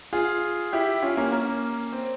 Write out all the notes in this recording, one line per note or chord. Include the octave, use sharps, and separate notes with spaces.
F4 G#4
E4 G4
C#4 F4
A#3 C#4
A#3 C#4
C4